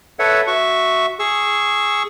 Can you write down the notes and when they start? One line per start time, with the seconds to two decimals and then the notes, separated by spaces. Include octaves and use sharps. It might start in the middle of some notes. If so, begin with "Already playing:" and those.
0.19 A4 B4 C#5 E5 F#5
0.47 F#4 E5 C#6
1.19 G#4 C#6 E6